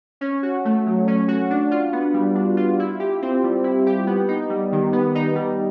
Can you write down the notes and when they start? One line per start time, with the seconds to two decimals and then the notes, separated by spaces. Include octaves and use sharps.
0.21 C#4
0.43 F#4
0.65 A3
0.86 F#3
1.08 C#4
1.28 F#4
1.50 D4
1.71 F4
1.93 B3
2.14 G3
2.35 D4
2.57 F4
2.79 E4
3.00 G4
3.22 C4
3.44 G3
3.64 E4
3.86 G4
4.07 B3
4.28 D#4
4.50 G3
4.72 D#3
4.93 B3
5.15 D#4
5.35 G3